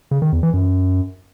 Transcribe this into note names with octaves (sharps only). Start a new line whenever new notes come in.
C#3
D#3
E2
E3
F#2